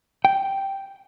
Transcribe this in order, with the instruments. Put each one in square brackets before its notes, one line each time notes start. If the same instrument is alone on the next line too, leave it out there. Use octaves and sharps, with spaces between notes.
[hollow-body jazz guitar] G5